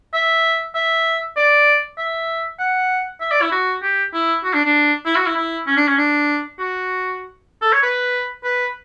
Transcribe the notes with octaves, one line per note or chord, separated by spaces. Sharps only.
E5
E5
D5
E5
F#5
E5
D5
E4
F#4
G4
E4
F#4
D4
D4
E4
F#4
E4
E4
C#4
D4
C#4
D4
F#4
A4
C#5
B4
B4